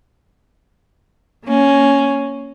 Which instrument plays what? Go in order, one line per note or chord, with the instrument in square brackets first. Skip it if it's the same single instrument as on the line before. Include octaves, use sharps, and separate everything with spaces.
[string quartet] A#3 C#4